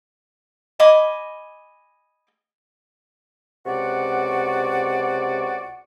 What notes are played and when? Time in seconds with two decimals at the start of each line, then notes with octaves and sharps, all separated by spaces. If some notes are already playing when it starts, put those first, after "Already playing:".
0.80 D#5 G#5 B5 D6
3.66 C#2 C3 F#4 D5 F#5